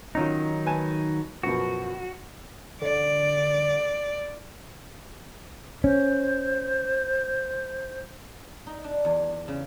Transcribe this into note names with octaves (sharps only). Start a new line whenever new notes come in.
D#3 F#3 C#4 D#4 F4
B4 G#5 A5
F#2 B2 F3 F#4
D3 D5
C#4 C5
D#4
D4
E2
C#3